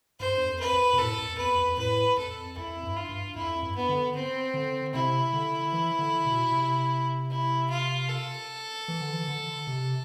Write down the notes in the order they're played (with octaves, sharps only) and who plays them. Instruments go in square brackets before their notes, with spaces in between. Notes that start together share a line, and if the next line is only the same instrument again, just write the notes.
[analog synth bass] G2 [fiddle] C5
[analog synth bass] E2
F2
[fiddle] B4
[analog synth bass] F2
B2
[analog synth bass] A2 [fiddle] A4
[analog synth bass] F2
[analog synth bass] E2 [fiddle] B4
[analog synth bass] F2
[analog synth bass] A2 [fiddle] B4
[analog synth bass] F2 [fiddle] A4
[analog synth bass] F2 [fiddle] E4
[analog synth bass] G2
[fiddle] F4
[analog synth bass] G2
[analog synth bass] F2 [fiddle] E4
[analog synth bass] G2
[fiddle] B3
[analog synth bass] D3
[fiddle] C4
[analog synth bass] D3
[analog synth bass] C3 [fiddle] E4
[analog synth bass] D3
E3
D3
B2
C3
[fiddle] E4
F4
A4
[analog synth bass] E3
D3
E3
D3
C3